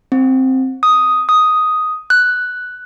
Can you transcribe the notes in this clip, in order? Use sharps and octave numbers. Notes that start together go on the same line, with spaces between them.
C4
D#6
D#6
F#6